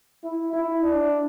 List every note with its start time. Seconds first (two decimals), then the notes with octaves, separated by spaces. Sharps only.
0.24 E4
0.53 E4
0.83 D4